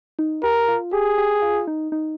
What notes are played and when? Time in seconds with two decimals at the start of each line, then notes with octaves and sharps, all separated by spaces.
0.19 D#4
0.43 G4 A#4
0.68 F4
0.92 G4 G#4
1.18 G4
1.42 F4
1.67 D#4
1.92 D#4